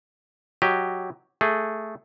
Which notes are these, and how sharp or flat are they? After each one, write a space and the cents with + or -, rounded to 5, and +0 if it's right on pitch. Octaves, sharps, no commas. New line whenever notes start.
F#3 +0 G4 +0 D#5 +0
A3 +0 G#4 +0